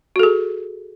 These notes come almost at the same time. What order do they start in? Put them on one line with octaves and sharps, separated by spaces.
F#4 A4 G#4